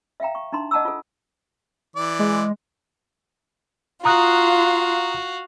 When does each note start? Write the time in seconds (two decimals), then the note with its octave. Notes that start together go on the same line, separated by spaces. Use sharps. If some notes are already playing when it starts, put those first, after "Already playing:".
0.20 E5 F5 G5 A#5
0.35 C#6
0.52 D4 D#4 A#5 C6
0.71 D#5 F#5 A5 A#5 D6 E6
0.85 F4 A4
1.96 E3 D5
2.19 G#3
4.05 F4 F#4 F5 A#5 D#6 F#6